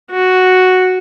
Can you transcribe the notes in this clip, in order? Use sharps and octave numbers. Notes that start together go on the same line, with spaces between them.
F#4